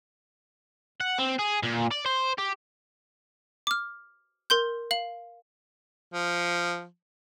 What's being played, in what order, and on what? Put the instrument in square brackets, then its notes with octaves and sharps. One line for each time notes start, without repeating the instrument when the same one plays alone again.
[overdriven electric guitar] F#5
C4
G#4
A#2
D5
C5
G4
[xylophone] D6 F6
A#4 C6 G6
F5 F#7
[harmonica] F3